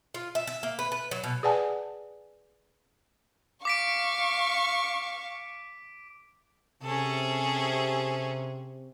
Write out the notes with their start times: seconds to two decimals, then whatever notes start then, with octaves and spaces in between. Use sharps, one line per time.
0.14 F4
0.35 E5
0.47 E5
0.63 A#3
0.79 B4
0.92 B4
1.11 F#3
1.24 B2
1.43 G#4 B4 D5 F#5 G#5 A5
3.65 F5 C#6 D6 B6 D7
6.82 C3 C#4 G#4 A4